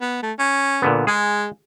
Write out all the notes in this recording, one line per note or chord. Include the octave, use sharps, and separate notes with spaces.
B3
A3
C#4
A#2 D3 B3
G#3 G#4